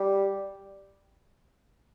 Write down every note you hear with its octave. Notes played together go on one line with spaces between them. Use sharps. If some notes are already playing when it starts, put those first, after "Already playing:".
Already playing: G3